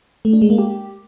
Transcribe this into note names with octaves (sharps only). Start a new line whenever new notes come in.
A3
D4
G#3
A#3
G4